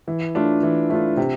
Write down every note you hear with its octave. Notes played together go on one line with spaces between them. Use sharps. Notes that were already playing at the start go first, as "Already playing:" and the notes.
E3
A3 D4 F4
E3
A3 D4 F4
C3